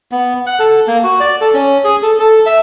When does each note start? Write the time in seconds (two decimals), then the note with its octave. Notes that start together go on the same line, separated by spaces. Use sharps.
0.12 B3
0.46 F#5
0.59 A4
0.87 A#3
1.04 F#4
1.20 D5
1.41 A4
1.54 C#4
1.84 G#4
2.02 A4
2.19 A4
2.46 E5